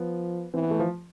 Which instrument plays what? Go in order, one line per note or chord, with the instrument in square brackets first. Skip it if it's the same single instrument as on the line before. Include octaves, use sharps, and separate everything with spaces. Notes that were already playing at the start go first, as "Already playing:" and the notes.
Already playing: [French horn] F3 [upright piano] B3
[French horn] E3 [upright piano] C4
[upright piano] B3
A3
F3